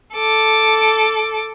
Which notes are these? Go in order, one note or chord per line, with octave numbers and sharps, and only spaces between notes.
A4 D6